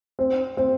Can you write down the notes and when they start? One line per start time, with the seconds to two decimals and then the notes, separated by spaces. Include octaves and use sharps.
0.19 C4
0.57 C4